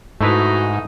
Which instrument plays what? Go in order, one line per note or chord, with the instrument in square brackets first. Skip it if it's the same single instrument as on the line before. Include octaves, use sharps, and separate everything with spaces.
[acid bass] G#2 [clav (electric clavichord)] A3 E4 B4 [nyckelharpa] D#4 [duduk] F#4